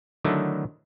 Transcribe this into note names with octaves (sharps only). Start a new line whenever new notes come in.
D3 D#3 F#3 A3 D#4 E4